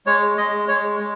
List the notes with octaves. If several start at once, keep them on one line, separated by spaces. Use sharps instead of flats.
G#3 C#5
G#3 D#5
G#3 C#5
G#3